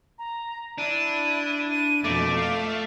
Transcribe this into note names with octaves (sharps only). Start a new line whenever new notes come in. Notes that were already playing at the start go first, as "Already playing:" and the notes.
A#5
D4 E4 D#7
D#7
F2 B2 A3 A#3 D6
F5